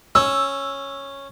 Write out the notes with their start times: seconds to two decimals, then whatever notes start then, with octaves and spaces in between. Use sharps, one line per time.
0.15 C#4 E6